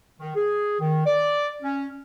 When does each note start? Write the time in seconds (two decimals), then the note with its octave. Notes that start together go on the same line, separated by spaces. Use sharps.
0.20 D#3
0.35 G#4
0.80 D#3
1.06 D5
1.63 C#4